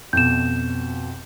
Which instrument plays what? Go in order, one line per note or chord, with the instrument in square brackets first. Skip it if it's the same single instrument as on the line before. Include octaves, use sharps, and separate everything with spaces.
[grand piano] F2 B2 [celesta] G6 E7